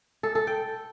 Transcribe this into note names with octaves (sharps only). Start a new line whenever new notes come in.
A4
A4
G5